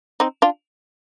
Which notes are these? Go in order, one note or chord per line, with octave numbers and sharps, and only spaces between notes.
C4 D#4
D4 F4